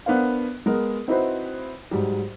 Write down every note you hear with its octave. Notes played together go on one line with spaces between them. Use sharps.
B3 D4 A#4 C5 F5
G#3 B3 A#4
C4 D#4 E4 F#4 B4 C5
G#2 F#3 G3